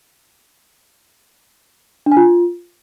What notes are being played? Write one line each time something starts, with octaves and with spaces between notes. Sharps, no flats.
D4
G#5
F4